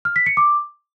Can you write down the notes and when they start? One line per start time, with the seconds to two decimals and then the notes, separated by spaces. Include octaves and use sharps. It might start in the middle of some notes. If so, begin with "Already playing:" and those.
0.05 F6
0.16 B6
0.26 C#7
0.37 D6